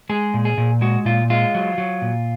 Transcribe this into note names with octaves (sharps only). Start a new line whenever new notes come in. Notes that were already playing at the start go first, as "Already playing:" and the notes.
G#3 G#4
A#2
G#4
A#2
G#3 F#4
A#2 F4
G#3 F4
F#3
F#3
A#2